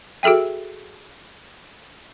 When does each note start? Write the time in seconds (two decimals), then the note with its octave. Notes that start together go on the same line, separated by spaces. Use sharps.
0.23 F#4 G#4 A4 E5 G5